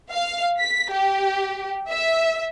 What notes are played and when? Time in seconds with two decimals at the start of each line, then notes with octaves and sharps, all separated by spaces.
0.11 F5
0.60 B6
0.92 G4
1.90 E5